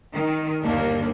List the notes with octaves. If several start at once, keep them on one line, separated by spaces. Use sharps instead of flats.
D#3
G1 D#2 A#3 D4